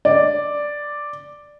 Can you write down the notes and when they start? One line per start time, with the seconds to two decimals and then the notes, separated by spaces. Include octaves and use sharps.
0.05 D5